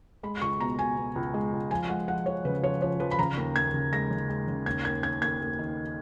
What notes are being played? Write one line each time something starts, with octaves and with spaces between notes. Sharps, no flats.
G#3 B5
C#2 C#6
B2 A#5
B2 G#5
B2
C#2
G#3
C#2
F3 G#5
G#3 F#5
F3 F#5
F3 C#5
C#3 B4
F3 C#5
F3 C#5
F3 B4
B5
C#3 A#5
D#2
D#2 G#6
C#3
G#3 A#6
C#3
G#3
C#3
D#2 G#6
D#2 G#6
D#2 G#6
D#2 G#6
D#2
D#3